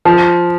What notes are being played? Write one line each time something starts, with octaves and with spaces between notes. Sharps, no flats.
F3